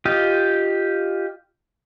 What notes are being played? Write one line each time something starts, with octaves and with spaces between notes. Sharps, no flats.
F4 G4 D#5